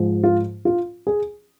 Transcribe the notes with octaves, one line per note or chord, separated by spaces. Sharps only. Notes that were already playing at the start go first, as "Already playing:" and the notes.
Already playing: G#2 F3 G#3
F4
F4
G#4